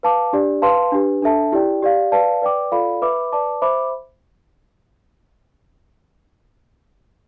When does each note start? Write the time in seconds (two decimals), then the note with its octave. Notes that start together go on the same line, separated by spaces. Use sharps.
0.03 B4 F5 A5 D6
0.33 D4 G4 D5
0.62 B4 F5 A5 C6
0.92 D4 G4 B4
1.22 D4 A4 E5 A5
1.52 E4 G4 D5 G5
1.82 G4 D5 F5
2.12 B4 D5 F5 A5
2.42 B4 D5 G5 D6
2.72 F4 A4 D5 F5 B5
3.02 B4 E5 B5 D6
3.32 B4 D5 A5 D6
3.62 C5 E5 B5 D6